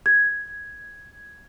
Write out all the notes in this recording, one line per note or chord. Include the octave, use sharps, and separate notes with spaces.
G#6